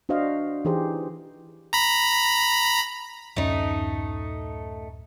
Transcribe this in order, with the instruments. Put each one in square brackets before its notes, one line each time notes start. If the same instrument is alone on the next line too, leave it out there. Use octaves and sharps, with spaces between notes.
[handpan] D4 F#4 C5 D#5 F5
E3 D#4 G4 G#4 C5
[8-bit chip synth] A#5 B5
[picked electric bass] D1 F#2 C#4 [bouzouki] A3 D#4